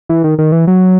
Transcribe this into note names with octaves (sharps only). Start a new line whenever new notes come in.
E3
D#3
D#3
E3
F#3